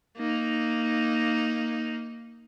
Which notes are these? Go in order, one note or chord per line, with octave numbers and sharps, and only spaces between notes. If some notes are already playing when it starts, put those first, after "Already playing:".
A#3 D#4